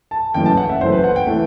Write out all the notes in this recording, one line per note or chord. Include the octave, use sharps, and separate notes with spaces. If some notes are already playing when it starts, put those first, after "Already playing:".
A5
F#1 F#2 E3 A3 G5
A5
F#5
E5
F#1 F#2 E3 A3 C5
B4
F#5
G5
E3 A3